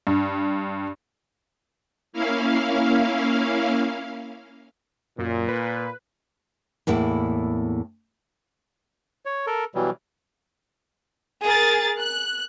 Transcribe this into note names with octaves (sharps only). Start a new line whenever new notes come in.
G2
A#3 C#4 E4 F5
F#2 A#2
B4
E2 A2 A#3 E4
C#5
A4 A#4
B2 E3 F#3 G3
G#4 A#4 A6
F#6